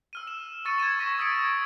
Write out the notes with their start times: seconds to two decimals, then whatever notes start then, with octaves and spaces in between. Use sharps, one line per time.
0.13 E6 F6 D#7
0.27 E7
0.65 C#6 E6 A6 C#7 D#7
0.78 G#6 A6 D#7 E7
0.99 C#6 A#6 B6 D#7
1.19 D#6 E6 G#6 B6 C#7 D7